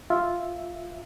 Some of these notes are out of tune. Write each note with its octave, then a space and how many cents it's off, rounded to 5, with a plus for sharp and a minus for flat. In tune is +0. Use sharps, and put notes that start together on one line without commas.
F4 +0 E5 +0